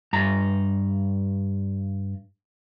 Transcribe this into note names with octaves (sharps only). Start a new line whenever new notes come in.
G2 A#5